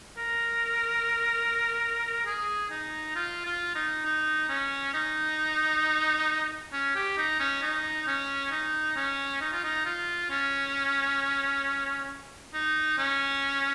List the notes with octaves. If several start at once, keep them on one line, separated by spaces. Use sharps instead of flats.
A#4
G#4
D#4
F4
F4
D#4
D#4
C#4
D#4
C#4
G4
D#4
C#4
D#4
C#4
D#4
C#4
D#4
F4
D#4
F4
C#4
D#4
C#4